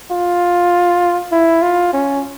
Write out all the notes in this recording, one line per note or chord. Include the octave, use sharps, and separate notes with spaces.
F4
E4
F4
C#4